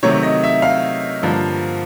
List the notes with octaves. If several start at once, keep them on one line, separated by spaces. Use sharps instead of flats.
C3 D#3 F#3 A3 C#5
D#5
E5
F5
G2 D3 F3 A#3